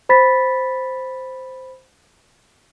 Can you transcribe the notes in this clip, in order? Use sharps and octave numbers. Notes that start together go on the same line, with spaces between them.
C5 B5 A6 B6